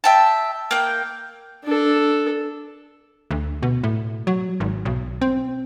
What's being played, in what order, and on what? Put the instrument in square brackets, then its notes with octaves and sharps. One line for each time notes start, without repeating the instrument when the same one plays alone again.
[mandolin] E5 G5 A5
A#3 G5
[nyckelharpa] D4 A4
[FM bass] D2
B2
A2
F#3
G#1
B1
C4